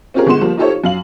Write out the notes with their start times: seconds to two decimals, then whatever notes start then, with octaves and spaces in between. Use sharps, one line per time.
0.14 C4 C#4 F4 G4 G#4 A#4
0.27 G1 G#3 B3 C6 E7
0.41 F3 G3 A#3
0.57 D#4 F4 G4 A4 C5 C#5
0.70 F4
0.84 F#2 F5 F#7